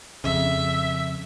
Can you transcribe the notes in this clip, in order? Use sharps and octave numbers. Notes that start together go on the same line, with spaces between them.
F2 C#3 E5